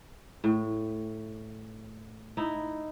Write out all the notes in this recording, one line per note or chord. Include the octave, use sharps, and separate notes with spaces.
A2
D#4 E4